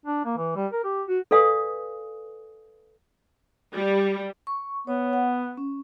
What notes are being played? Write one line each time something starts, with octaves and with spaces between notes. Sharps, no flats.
D4
A#3
E3
G3
A#4
G4
F#4
A4 B4 D5 F5 G#5 D#6
G3
C#6
B3 C#5
F#5
C#4